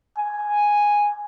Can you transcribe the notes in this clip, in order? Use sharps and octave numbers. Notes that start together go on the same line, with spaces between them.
G#5